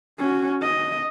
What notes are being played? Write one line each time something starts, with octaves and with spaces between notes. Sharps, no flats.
C#4 F#4
D#5